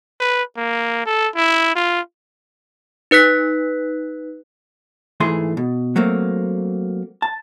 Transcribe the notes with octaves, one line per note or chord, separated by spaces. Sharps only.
B4
A#3
A4
E4
F4
D#4 B4 F#6 B6
G#2 E3 A3 G#4 C6
B2
F#3 A3 A#3 C4
A5